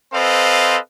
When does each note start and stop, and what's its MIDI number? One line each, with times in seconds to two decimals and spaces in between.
0.13 0.78 60
0.13 0.78 69
0.13 0.78 71
0.13 0.78 72
0.13 0.78 75
0.13 0.78 77